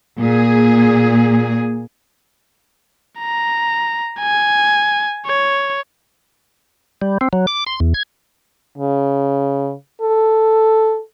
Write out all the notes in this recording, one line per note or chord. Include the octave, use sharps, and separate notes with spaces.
A#2 G#4
A#5
G#5
C#5
G3
C4
F#3
D6
C6
E2
G#6
C#3
A4